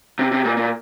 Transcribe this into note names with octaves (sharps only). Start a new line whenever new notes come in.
C3
C3
A#2
A#2